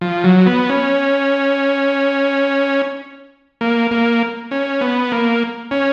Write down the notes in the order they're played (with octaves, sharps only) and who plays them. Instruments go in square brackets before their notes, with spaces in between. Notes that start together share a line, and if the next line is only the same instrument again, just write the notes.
[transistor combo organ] F3
F#3
B3
C#4
A#3
A#3
C#4
B3
A#3
C#4